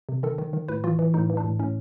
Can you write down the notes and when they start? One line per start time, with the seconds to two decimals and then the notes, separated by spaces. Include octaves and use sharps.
0.09 C3
0.23 D#3 A4
0.38 D#3
0.53 D#3
0.68 A2 B4
0.84 E3 F4
0.99 E3
1.14 A2 D#4
1.30 E3
1.37 D4
1.44 A2
1.59 A2 C#4